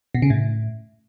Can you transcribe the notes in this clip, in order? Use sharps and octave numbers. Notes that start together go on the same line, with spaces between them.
B2
C#3
A2